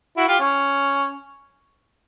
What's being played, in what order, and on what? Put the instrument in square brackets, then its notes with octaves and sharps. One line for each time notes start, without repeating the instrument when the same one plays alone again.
[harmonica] E4 F#4
F4 G4
C#4